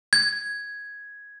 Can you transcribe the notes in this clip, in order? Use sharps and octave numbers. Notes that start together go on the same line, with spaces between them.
G#6